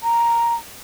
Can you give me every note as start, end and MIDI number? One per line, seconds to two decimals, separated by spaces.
0.03 0.54 82